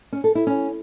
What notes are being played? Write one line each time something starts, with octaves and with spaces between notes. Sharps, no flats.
C#4
A4
E4
C#4